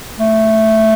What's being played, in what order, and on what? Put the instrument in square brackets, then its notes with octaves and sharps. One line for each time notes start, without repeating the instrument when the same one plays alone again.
[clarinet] A3